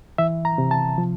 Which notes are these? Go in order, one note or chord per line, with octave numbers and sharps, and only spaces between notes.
E3 E5
A#5
C3
A5
F3